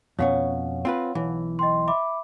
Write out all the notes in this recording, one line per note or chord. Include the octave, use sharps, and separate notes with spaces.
F2 B2 C#4 C#5 F5 F#5
C4 F4 B4
B1 E3
D#5 G5 C6
E5 B5 D6